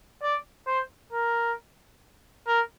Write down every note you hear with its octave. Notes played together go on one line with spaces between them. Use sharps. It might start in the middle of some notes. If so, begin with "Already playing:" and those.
D5
C5
A#4
A#4